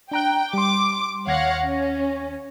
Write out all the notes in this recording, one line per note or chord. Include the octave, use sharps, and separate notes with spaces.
D4 G5 A#5 F#6
G3 C6 D6
D#2 C#5 F5 F#5 G#6 A#6
C#4